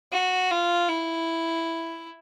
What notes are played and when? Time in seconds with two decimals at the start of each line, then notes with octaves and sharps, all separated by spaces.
0.12 F#4
0.51 F4
0.88 E4